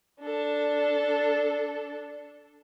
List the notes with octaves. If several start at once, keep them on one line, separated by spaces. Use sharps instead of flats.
D4 A4